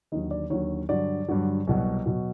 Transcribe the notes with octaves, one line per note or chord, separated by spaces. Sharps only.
D#2 D3 F#3 D#5
D5
D#2 D3 F#3 C#5
G2 D3 F#3 D5
G2 D3 F#3
C2 B2 F#3
B2 F#3